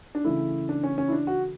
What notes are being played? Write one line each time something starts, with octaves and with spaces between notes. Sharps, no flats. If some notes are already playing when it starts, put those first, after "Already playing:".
D4
C#3 E3 A3 E4
D4
C#4
C#4
E4
D4
F#4